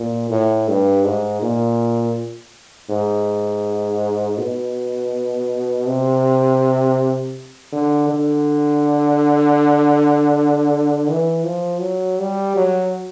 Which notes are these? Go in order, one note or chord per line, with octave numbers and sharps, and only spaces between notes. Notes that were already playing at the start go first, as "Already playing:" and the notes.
Already playing: A#2
A2
G2
G#2
A#2
G#2
B2
C3
D3
D3
E3
F3
F#3
G3
F#3